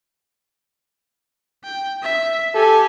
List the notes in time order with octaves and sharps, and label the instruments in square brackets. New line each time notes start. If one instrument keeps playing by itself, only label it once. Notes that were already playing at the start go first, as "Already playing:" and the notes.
[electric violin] G5
E5
[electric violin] G4 G#5 [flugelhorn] A4